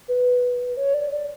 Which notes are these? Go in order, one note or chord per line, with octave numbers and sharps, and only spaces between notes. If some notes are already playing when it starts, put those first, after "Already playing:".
B4
C#5
D5
D5